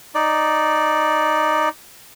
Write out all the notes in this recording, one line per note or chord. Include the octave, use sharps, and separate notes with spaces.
D#4 D5